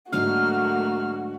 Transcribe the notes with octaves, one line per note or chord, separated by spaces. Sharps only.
G#2 D3 F#3 A3 A#3 F#4 F6